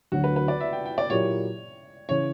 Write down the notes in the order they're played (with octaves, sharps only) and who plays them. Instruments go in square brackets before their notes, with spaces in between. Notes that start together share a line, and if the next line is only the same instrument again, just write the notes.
[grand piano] D2 D3 F#3 [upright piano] F#4
[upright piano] B4
B4
D5
E5
G5
G5
D5
[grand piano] A#2 F#3 A#3 E4 G4 [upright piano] C#5
[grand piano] C#3 E3 [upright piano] C#5